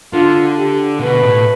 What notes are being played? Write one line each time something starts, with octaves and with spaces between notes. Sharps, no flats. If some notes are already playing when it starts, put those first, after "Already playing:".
D3 F4
G4
B2 B4
A2